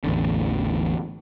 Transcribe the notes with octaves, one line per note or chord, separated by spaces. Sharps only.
A1 E2 D3